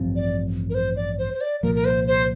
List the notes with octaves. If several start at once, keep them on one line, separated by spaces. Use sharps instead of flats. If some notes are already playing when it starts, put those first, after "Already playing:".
Already playing: A1 G2 F3 C4
D5
A#4
C5
D5
C5
C5
D5
C2 A#2 F3 A#3 A#4
A#4
C5
C5